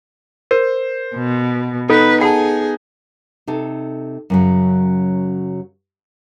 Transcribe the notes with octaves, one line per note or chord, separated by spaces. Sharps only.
A#4 C5
B2
B3 D#4 A4 B4
G#4 F#5 A5
C3 D#4 A4
F#2 C#3 F#3